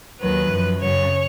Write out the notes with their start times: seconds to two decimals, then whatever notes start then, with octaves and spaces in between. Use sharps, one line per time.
0.19 D#2 D#3 F#3 B4
0.49 F#2 F3
0.79 F#2 C#3 F#3 C#5